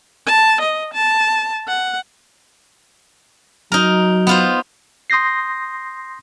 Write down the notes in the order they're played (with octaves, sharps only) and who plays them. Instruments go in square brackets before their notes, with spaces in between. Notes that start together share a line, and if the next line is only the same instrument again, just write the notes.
[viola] A5
D#5
A5
F#5
[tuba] F#3 [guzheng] D#4 A#4
[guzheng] B3 F4 C5
[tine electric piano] C6 D#6 G6 A#6 C7